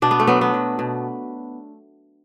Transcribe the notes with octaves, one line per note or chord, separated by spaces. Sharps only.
B2 D4
B3
A3
F#3 B3
B3
F#3
B2